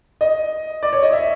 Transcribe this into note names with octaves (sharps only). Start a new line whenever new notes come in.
D#5
D5
C#5
D#5
E5